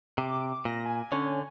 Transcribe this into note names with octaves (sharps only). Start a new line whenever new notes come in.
C3 D6
A#2 A#6
G#5
D3 C#4 C#5